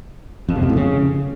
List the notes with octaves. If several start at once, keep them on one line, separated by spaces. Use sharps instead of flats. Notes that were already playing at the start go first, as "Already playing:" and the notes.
F2
C3
F2
A2
C#3